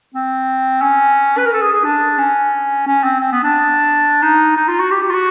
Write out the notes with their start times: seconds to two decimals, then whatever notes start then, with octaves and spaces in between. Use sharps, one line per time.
0.14 C4
0.82 C#4
1.37 B4
1.45 A#4
1.53 A4
1.62 G#4
1.73 G#4
1.84 D4
2.18 C#4
2.87 C#4
3.03 C4
3.20 C4
3.32 B3
3.43 D4
4.22 D#4
4.57 D#4
4.68 F4
4.79 F#4
4.91 G4
5.02 G4
5.09 F4
5.14 F#4